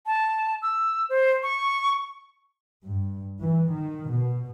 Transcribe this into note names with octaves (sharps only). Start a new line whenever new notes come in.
A5
E6
C5
C#6
G2
E3
D#3
B2